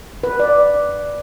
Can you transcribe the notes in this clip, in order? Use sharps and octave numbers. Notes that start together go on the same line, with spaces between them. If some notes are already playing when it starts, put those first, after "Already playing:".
B4
D5